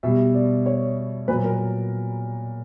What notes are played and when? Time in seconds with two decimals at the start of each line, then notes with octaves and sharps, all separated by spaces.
0.03 B2 G3 E5
0.34 D5
0.66 C#5
1.28 A#2 F#3 B4
1.44 A#4